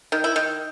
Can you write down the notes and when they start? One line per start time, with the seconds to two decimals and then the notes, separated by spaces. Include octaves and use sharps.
0.12 D#3
0.24 E4
0.36 D#3